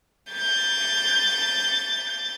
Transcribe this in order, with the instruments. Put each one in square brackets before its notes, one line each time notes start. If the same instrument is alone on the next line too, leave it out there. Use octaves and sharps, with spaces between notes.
[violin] G6 A6